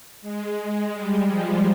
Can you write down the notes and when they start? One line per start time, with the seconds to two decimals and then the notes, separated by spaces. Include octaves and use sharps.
0.21 G#3
0.57 G#3
0.93 G3
1.28 F3